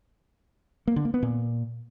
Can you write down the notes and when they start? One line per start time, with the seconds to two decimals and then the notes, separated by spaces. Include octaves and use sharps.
0.87 A#3
0.96 D3
1.05 A#3
1.14 B3
1.23 A#2